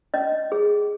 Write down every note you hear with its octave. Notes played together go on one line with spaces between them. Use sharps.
C#4 D#5
G#4